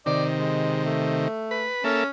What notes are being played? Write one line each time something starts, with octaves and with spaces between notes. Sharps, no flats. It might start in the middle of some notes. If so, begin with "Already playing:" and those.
C3 D#3 D5
G#3
A3
B4
A#3 C#4 A4 E5